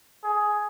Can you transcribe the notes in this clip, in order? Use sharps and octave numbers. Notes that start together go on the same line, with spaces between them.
G#4